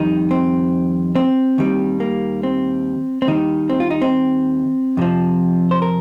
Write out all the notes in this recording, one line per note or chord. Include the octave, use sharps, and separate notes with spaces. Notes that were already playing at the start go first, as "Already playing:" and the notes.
Already playing: F2 D#3 G3 D#4
C4
C4
D#2 D#3 G3
A#3
C4
C4
D#2 D#3 G3 D#4
C4
F4
D#4
C4
F2 C3 F3
C5
A#4